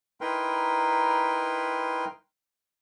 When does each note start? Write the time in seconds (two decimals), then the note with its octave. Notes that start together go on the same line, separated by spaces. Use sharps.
0.21 D#4 E4 A#4 B4 G5 C6